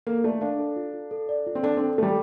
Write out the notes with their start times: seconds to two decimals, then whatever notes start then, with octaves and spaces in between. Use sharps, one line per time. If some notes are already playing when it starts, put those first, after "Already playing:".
0.07 A#3 A4
0.24 A3 D5
0.41 D4 F5
0.59 A4
0.76 F4
0.93 F4
1.11 A4
1.29 D5
1.46 F4
1.55 C4
1.63 D4 A4
1.77 C4 A4
1.98 G3 A3 A4